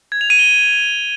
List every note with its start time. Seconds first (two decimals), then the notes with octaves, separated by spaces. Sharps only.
0.12 G#6
0.21 F7
0.30 D#7
0.39 G7